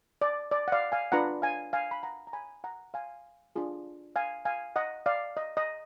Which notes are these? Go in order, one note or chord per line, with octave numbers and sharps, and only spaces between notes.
D5
D5
F#5
D5 F5
F5 G#5
D4 F4 B4 F#5 A#5
F5 G#5
F5 G#5
B5
F#5 A#5
A#5
G#5 B5
F#5 A#5
F5 G#5
D4 F4 G#4
F5 G#5
F5 G#5
D#5 F#5
D5 F5
D#5
D#5